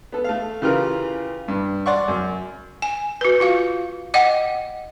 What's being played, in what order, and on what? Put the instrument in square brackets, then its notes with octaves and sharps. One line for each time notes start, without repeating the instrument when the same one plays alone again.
[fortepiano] B3 A4
A3 F5
C#3 E3 F4 G4 A#4
G2
D5 F#5 C6 C#6
F#2
[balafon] G#5
F#4 B4
F4 F#4 F5
D#5 F#5 G5 D6